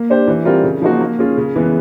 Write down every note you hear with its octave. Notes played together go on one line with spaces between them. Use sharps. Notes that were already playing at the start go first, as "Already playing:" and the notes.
Already playing: A#3
D4 G4 C5
E3
G3 C4 F4 A#4
C#3
F3 A#3 D#4 F#4
A#3
C#4 F4 G#4
C#3
E3 G#3 B3